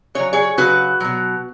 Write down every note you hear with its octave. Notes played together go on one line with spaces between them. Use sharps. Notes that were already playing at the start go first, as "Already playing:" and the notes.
C#3 F#3 C#5
G#4 C#5
C#3 F#3 F#4 B4
B2 F#3